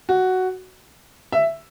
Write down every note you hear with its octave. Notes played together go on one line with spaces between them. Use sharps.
F#4
E5